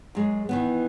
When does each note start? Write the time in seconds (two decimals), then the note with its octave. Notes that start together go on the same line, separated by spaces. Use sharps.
0.15 F#2 G#3
0.49 D#3 E3 B3